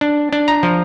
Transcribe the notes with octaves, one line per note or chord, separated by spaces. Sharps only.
D4
D4
A#5
F3